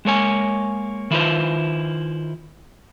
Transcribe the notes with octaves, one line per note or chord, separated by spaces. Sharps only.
G#3 A#3 C#5 G#5
D#3 E4 F4 B4 C5